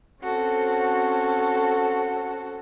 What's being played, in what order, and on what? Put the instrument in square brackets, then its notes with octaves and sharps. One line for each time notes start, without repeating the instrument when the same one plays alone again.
[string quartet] C4 C#4 F#4 A4